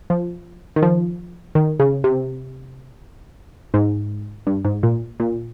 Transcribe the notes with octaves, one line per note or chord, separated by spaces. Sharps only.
F3
D#3
F3
D#3
C#3
C3
G#2
G2
G#2
A#2
A#2